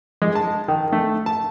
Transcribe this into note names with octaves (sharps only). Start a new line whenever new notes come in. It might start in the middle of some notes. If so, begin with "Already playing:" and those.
G#3
A5
D#3
A3
A5